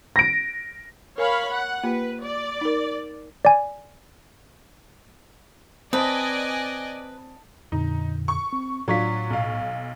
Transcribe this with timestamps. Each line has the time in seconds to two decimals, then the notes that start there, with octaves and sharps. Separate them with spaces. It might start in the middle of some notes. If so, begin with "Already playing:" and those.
0.16 A#6 D7
1.18 A#4 C#5 F5 G#5 B5
1.51 F#5
1.84 A#3 F4 G4 B4
2.22 D5
2.61 D#4 A#4
3.45 D5 G#5
5.93 C4 B4 D5 D#5 G#5 A5 D#6
7.72 F2 A#2 D3 D#4
8.28 C#6
8.53 C4
8.88 A2 F#3 D4 F4 C#6 B6
9.30 B1 F5